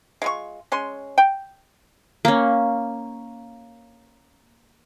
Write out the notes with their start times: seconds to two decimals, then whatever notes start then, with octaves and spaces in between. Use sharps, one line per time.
0.22 G#3 F4 C#6
0.72 G#3 C#4 C6
1.18 G5
2.25 A#3 C#4